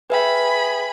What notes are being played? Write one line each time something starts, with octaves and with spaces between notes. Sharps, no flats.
G#4 B4 E5 G5 B5